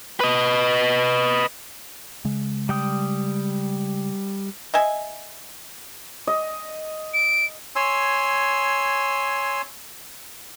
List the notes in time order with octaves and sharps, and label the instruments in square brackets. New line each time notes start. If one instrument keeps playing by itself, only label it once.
[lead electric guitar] B4 D#5
[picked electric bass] C#3 G#3
[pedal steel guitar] G3 G5 D#6
[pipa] D#5 E5 G#5
[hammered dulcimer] D#5
[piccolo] D7
[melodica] C#5 G#5 C6 E6